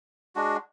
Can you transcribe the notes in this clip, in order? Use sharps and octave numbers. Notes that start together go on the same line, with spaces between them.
G#3 D4 F#4